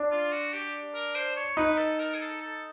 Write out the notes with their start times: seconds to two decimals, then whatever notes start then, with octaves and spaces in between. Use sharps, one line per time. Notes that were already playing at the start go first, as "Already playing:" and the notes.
Already playing: D4
0.11 F4
0.32 F#4
0.53 G4
0.95 A#4
1.15 C5
1.37 C#5
1.57 D#4 B4
1.77 A4
1.99 A#4
2.15 G#4
2.20 A4
2.41 A4